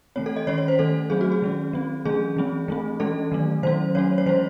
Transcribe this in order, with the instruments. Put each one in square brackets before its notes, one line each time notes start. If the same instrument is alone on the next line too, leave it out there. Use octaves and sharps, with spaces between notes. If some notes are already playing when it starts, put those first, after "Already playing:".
[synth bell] E3 A3 C4 C#5
A4
D#5
D#3 G#3 C#4 C#5
C#5
C5
D#3 A3 C#4 A4
F#3 A3 C4 G#4
F#4
G#4
D#3 G#3 C#4
F#3 C4
E3 A3 C#4 G#4
E3 G#3 C4
E3 A3 C4
E3 G#3 C#4 A4
D#3 F#3 A3
D#3 F#3 C#4 C5
F#3 A3 C#4 C#5
C#5
E3 G#3 C#4 C5